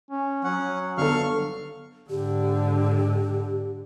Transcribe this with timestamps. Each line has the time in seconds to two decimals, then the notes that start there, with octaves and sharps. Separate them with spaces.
0.11 C#4
0.44 F#3 C#4 F#5
0.98 G1 A4 F5 C#6 F6
2.10 G#2 D3 G4